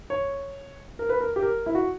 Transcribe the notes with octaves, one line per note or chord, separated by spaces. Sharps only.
C#5
A#4
B4
A#4
G4
A#4
E4
F#4